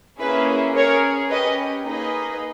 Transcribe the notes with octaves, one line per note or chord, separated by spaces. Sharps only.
A#3 C#4 E4 G#4 B4
C#4 G#4 A#4 C#5
C#4 G4 B4 D#5
A#3 D#4 G#4 B4 D#5